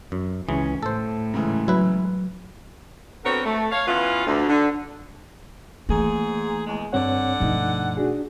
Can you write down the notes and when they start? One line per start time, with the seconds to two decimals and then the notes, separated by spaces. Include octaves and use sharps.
0.12 F#2
0.49 C#2 E3 C#4 G#4
0.83 A2 A4 C5
1.34 G#2 C#3 E3
1.68 F#3 E4 B4
3.25 D3 B3 C4 F#4 A#4 C#5
3.46 A3
3.72 C#5 F5
3.88 E3 B3 C#4 F4
4.27 D2
4.49 D3
5.89 G#2 E3 A3 A#3 G#4
6.66 E2 G#3
6.93 G2 D3 C4 C#5 F#5
7.40 G2 B2 F3 A3 D#4
7.97 D4 F#4 G#4